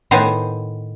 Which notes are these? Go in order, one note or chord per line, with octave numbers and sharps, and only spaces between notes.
A2 D#3 B3 D#4 C5 G#5